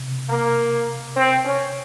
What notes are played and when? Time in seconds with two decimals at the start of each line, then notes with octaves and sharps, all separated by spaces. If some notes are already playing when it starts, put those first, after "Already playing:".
Already playing: C3
0.30 A#3
1.16 C4
1.45 C#4